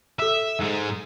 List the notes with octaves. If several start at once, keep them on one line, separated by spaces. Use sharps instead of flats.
A4 E5 E6
G#2 G#3